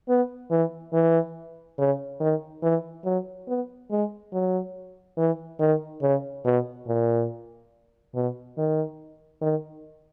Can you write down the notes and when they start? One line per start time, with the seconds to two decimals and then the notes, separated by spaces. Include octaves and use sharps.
0.09 B3
0.51 E3
0.93 E3
1.79 C#3
2.21 D#3
2.63 E3
3.05 F#3
3.48 B3
3.91 G#3
4.33 F#3
5.18 E3
5.60 D#3
6.02 C#3
6.45 B2
6.88 A#2
8.15 B2
8.58 D#3
9.42 D#3